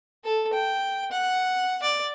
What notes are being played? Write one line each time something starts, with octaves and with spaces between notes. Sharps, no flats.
A4
G5
F#5
D5